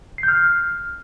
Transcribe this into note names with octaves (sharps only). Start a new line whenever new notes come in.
C7
G6
F6